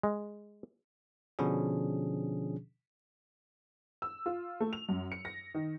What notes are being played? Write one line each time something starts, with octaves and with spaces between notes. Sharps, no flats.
G#3
B2 D3 F3 C#4 D4 G#4
E6
F4
A3
F7
F#2
C#7
A#6
D#3